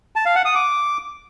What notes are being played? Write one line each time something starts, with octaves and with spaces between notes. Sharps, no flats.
A5
F5
F#5
D#6
D6